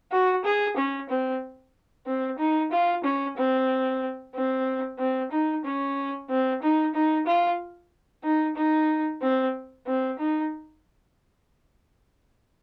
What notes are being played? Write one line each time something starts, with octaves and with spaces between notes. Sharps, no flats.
F#4
G#4
C#4
C4
C4
D#4
F4
C#4
C4
C4
C4
D#4
C#4
C4
D#4
D#4
F4
D#4
D#4
C4
C4
D#4